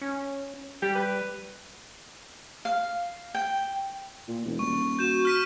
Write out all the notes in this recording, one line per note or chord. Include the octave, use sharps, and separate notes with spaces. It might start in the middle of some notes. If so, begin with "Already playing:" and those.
C#4
G3 G4
B4
F5
G5
A#2
E1
D#1 C#6
F#4 G6 E7
F6 B6 D#7